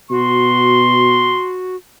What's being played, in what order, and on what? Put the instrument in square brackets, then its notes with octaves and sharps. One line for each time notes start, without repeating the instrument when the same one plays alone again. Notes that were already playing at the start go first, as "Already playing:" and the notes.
[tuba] B2 [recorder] F#4 [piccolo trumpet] C6